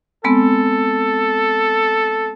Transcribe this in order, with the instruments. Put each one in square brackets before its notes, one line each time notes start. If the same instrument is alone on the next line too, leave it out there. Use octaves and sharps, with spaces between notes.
[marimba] G#3 B3 C4 [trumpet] A4